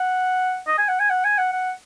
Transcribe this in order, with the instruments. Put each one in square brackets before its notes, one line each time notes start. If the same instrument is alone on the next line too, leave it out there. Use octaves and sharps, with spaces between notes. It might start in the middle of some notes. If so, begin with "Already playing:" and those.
Already playing: [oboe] F#5
D#5
G#5
F#5
G#5
F#5
G#5
F#5
F#5